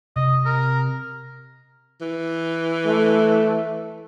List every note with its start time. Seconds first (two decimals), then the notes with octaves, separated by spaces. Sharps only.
0.16 C3 D#5
0.46 A#4
2.01 E3
2.86 A3